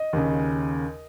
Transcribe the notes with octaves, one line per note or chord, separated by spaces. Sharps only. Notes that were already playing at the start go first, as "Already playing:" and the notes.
Already playing: D#5
D#2 C#3